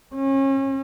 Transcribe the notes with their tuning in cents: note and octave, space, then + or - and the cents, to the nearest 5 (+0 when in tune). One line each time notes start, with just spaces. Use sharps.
C#4 -35